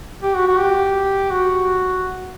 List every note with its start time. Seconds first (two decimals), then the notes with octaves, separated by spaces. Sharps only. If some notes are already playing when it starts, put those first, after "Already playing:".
0.23 G4
0.35 F#4
0.47 F#4
0.59 G4
1.31 F#4